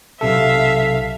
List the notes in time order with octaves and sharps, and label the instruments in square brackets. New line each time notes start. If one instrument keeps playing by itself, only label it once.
[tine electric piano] B1 C3 A4 [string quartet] E5 F5